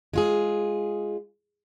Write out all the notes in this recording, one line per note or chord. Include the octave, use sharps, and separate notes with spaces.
G#3 F4 G#4